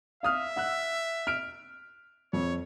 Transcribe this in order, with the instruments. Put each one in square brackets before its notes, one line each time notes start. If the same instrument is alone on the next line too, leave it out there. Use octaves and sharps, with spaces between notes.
[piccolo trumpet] E5 [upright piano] F5 D#6 F6
[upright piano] F#5 E6 F#6
F6 D7
[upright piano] F2 [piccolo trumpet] C#5